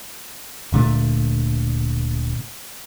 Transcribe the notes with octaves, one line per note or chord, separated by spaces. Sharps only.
D1 A#2 D3 A3